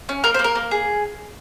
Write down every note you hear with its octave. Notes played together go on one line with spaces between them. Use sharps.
C#4
A#3 A#4
C5
A#3
A#4
A#3
G#4